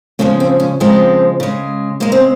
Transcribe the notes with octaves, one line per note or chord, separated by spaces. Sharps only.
C#3 F3 G#3 A#3
C4
C#4
C#3 F3 G#3 C4
C#3 G#3
C#3 G#3 A#3
C4